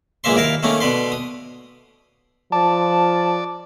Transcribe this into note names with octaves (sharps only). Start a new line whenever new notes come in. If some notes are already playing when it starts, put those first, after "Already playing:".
A#1 E3 G#3 A#3 E5 C6
D#2 E4 A#4 F5
D#3 A3 A#3 C#4
B2 D3 B4 C6
D#6
F3 D5 A5